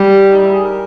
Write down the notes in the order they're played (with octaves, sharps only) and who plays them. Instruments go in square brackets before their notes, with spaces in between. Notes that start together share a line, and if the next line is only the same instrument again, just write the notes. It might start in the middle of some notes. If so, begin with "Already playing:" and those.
Already playing: [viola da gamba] G3 [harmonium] G4
[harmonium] D#4
E4
G#4
A#4